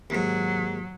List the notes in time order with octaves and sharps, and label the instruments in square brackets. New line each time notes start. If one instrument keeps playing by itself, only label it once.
[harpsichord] D#2 G#2 [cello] F#3